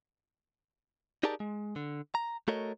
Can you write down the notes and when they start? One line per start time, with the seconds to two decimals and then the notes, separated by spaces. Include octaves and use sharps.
1.23 D#4 G4 G#4 A#4 D5 A5
1.40 G#3
1.76 D3
2.15 A#5
2.48 A3 F#4 A4 A#4 C#5 D#5